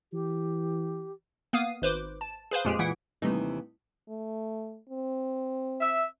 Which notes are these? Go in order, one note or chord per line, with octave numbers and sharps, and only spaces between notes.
E3 G4
A#3 B3 F5 D#6 D#7
G#1 B4 C5 D6
A5
G#4 B4 C5 F5
F2 A#2 G#3 G4 G#4
A#2 E3 E4 F#5 D7
D#2 C3 E3 G3 A3 D#4
A3
C4
E5